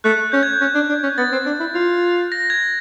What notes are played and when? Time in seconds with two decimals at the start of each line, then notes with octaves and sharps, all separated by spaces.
0.04 A3 F#6
0.32 C#4 G6
0.43 G#6
0.53 G6
0.61 C#4
0.75 D4
0.89 D4
1.03 C#4
1.18 B3 A6
1.32 C4
1.46 D4
1.60 E4
1.74 F4
2.32 A#6
2.50 G#6